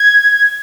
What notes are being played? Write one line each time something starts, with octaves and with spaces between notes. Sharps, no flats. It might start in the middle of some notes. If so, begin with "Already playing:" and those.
Already playing: G#6